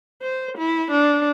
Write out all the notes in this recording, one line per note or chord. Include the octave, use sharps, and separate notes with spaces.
C5
E4
D4